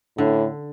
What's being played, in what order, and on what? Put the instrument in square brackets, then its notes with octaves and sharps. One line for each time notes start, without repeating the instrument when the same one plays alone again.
[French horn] A2 [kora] D3